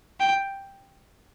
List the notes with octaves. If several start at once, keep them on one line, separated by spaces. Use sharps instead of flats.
G5